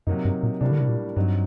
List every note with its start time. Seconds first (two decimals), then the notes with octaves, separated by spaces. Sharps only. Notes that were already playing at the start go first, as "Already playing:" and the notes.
0.07 F#2 C3 F#3 A#3 D#4
0.25 G2
0.43 A#2
0.61 A2 C3 G3 A#3 D4
0.71 D3
0.80 C3
0.89 A#2
1.16 G2 F#3 C4 D#4